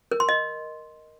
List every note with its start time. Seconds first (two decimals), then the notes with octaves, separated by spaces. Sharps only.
0.12 A#4
0.20 C6
0.29 D#5